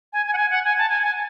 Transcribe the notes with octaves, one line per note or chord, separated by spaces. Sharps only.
G#5
G#5
F#5
G#5
F#5
G#5
A5
G#5
G#5